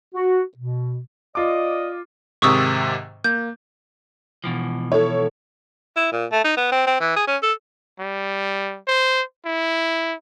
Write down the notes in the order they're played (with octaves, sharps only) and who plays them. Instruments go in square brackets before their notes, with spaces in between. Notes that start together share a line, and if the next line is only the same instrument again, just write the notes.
[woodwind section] F#4
B2
[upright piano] F4 D6 [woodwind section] D5 D#5
[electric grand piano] G#2 C3 D#3 [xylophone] C#6 D#6 E6
[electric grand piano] A#3 [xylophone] G6
[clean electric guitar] B2 E3 F3
[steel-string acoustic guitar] E4 A4 [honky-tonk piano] C#5
[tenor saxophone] E4
A#2
A3
D#4
B3
C4
C4
E3
G#4
C#4
A4
[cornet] G3
C5
E4